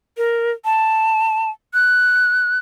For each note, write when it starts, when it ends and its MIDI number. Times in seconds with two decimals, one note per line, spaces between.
0.17 0.51 70
0.65 1.50 81
1.74 2.58 90